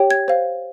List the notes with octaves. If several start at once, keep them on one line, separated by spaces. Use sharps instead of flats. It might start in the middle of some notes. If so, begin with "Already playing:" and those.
Already playing: G4 C#5 G5
G#6
C5 F5